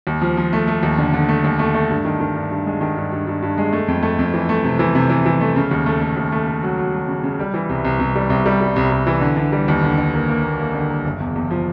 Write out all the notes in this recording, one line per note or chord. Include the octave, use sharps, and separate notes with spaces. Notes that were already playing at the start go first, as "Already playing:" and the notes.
D#2
F3
F3
A3
A3
D#2
D3
D3
A3
D#2
A3
A3
G2
D#3
D#3
G2
G2
G#3
D#3
G2
G2
G2
G2
G#3
A3
F2
A3
F2
E3
A3
C3
E3
C3
E3
E3
A3
C#3
D#2
A3
A3
D#2
A3
A3
F#3
F#3
F#3
C#3
C#3
G3
E3
C2
C2
C2
G3
C2
G3
G3
C2
C2
E3
D3
D3
G3
D#2
D3
D3
A#3
A#3
A#3
A#3
D3
A#3
F#1
E2
E2
F3